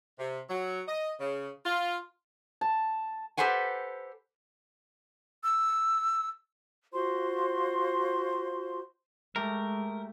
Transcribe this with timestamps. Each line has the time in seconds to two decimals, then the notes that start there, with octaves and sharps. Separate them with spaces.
0.19 C3
0.49 F#3
0.88 D#5
1.21 C#3
1.66 F4
2.61 A5
3.37 G4 A4 B4 C5 F#5 G#5
5.44 E6
6.92 F4 F#4 C5 C6
9.36 G#3 A3 G4 A#4